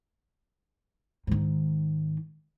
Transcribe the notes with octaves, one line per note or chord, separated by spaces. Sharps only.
G#2 D#3